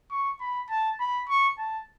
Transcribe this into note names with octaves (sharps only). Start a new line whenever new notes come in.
C#6
B5
A5
B5
C#6
A5